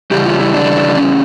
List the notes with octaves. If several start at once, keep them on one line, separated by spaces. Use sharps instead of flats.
C#3 E3 G3 G4
F4
E4
D4
C#4